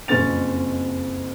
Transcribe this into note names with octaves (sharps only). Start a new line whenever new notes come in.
F#1 F2 C4 C#4 A6 F7